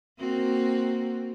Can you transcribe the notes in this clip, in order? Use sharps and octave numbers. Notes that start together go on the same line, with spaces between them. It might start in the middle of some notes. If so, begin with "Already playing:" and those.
A#3 C4 F#4